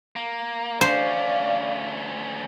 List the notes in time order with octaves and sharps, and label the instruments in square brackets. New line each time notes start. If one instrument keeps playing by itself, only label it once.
[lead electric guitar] A#3
[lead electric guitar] D2 C#4 [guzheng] C5 [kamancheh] D5 F5